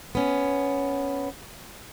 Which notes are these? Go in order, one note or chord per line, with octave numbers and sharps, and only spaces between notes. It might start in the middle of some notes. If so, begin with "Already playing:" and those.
B3 C#4